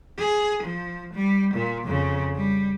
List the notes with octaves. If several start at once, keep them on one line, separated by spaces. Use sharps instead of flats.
G#4
F3
G3
A#2
F2 C#3
G3